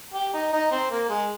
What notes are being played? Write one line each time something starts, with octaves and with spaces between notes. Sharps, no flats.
G4
D#4
D#4
C4
A#3
G#3